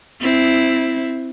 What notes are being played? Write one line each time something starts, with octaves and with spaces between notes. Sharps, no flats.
C4 E4